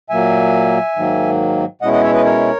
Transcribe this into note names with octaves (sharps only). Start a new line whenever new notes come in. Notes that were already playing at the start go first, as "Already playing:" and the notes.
A#2 F#3 A#3 E5 G#5
G#2 D#3 F#3 A#3
B2 G#3 C#4 E4 D#5 F#5
D#5 F#5
C#5 E5
B4 D#5
A#4 C#5